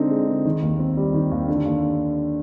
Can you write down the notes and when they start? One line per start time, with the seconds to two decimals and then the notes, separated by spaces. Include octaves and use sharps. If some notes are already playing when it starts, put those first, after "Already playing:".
Already playing: D3 G#3 C4 D#4
0.11 G#3
0.28 D3
0.45 D#3
0.62 D#2
0.79 C4
0.97 G3
1.14 D#3
1.31 D#2
1.48 D3
1.65 D#2